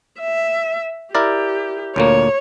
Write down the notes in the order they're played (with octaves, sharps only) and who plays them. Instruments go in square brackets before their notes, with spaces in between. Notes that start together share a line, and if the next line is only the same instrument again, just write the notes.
[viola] E5
[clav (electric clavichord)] E4 A#4 D5 [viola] G4
[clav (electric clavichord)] D2 A#2 A#3 [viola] C#5